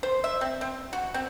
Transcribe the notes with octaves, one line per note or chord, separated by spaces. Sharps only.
C5
E5
C4
C4
F#4
C4